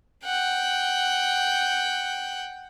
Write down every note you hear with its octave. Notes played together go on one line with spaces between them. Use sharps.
F#5 G5